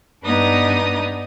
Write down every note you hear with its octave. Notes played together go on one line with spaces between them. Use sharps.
G2 B3 D4 D#4 D#6